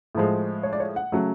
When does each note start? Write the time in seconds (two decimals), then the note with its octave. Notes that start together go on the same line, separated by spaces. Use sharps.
0.15 A2 F3 G#3
0.63 C#5
0.73 D5
0.80 C#5
0.96 F#5
1.12 C#3 F#3 A3